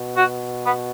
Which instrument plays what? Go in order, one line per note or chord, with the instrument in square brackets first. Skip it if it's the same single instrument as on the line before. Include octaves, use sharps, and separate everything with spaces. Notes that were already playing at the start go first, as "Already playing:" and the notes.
Already playing: [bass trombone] B2
[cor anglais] F#4
B3